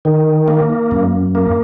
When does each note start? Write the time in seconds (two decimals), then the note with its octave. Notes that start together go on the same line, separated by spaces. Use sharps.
0.05 D#3
0.48 A#3
0.91 F#2
1.35 A#3